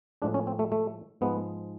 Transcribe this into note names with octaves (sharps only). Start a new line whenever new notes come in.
A2 F3 G#3 D4
C#4
C4
A3
A3
G#2 F3 G#3 B3